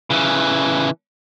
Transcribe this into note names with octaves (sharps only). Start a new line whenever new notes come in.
C#3 E3